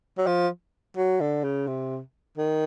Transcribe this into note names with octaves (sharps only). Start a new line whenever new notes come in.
F#3
F3
F#3
D3
C#3
C3
D#3